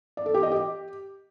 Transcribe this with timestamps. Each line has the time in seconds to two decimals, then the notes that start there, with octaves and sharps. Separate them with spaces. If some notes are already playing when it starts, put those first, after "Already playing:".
0.17 D5
0.26 A4
0.34 G4
0.43 D#5
0.52 G4